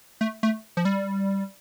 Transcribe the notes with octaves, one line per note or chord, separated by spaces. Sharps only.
A3
A3
F3
G3